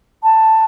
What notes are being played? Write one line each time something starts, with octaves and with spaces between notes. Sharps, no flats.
A5